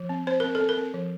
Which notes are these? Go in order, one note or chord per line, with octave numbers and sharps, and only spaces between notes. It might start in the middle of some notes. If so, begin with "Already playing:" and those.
Already playing: F3
C4
C4 C5
C4 A#4
A4
C4
A#4
C4
F3